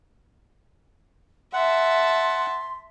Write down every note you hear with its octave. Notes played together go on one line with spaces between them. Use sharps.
E5 F#5 A5 C6